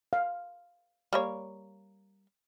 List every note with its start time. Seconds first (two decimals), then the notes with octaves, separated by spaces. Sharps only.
0.13 F5
1.13 G3 A#3 C#5